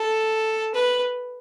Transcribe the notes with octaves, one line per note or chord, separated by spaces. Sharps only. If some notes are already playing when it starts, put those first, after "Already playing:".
Already playing: A4
B4